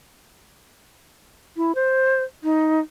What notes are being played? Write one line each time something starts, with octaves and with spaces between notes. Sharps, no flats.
E4
C5
D#4